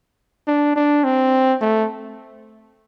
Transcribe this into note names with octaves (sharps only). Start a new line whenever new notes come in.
D4
D4
C4
A3